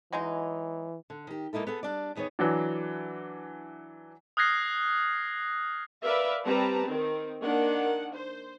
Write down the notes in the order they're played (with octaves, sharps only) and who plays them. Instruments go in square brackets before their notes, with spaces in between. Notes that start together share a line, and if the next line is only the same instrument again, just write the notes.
[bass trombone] E3 [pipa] F#3 G#3 D#4
[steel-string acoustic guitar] D3
D#3 G4
G#3 A#3 D#4 E4 A4
B3 G#4 A4
G3 D4 D5
E2 D#3 B3 G#4 C#5
[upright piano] E3 F#3 D4
[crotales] D#6 F6 F#6 G#6 A#6 C7
[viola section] A#4 B4 D5 E5 F5
G3 C4 B4 A5 A#5
D#3 C4
D#3 A#3 D4 F#5
C5